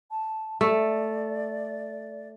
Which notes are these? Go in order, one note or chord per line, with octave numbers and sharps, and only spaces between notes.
A5
A3 D5